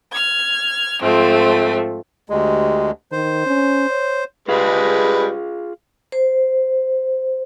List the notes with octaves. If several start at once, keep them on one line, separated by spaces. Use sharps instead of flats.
F6 G#6
G#2 F3 A3 C4
D2 G#3 G4
D#3 C5
C#4
C#5
G3 G#3 F4 G#4 B4 F5
C5